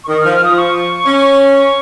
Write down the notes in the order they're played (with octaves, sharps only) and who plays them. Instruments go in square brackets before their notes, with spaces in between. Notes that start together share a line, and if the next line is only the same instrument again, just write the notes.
[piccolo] C#6
[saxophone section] D#3 [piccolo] D#6
[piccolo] F6
[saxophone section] F3
[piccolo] F6
[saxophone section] F3 [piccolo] D#6
[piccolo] C#6
[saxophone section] C#4
[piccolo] C#6